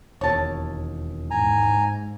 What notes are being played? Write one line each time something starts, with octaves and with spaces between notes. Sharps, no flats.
E1 D#2 C#5 A5
G#2 G#5 A#5